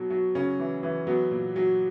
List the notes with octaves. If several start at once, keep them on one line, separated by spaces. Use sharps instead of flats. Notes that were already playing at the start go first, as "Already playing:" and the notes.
Already playing: B2 F#3
F#3
C#3 C#4
E3
E3
F#3 B3
A#2
F#3